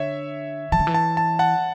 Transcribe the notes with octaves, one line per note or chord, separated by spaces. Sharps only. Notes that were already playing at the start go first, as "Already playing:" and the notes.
Already playing: D3 C#5 E5
E3 A5
D3
E3
A5
A5
F#5 A5